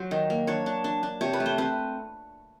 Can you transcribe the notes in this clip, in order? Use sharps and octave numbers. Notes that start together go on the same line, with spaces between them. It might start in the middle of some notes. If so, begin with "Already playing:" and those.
Already playing: F#3 C5
D#3
A#3
D4 C#5
D4
D4
D4
C3 C#5
B4
A3
C5
C4 B4